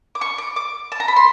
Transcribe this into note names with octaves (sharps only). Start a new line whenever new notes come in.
D6
C#6
D6
D6
A5
A#5
B5
C6